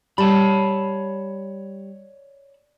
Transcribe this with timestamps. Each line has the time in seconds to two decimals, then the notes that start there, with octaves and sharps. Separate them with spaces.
0.18 G3 C#5 A5 B5